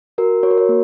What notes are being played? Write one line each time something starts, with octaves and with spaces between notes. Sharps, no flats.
F#4 A#4
F#4 C#5
A#4
C#5
A#3